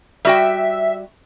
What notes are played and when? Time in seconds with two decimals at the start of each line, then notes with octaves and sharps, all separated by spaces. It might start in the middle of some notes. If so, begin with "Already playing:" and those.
0.25 G3 F#4 E5 G5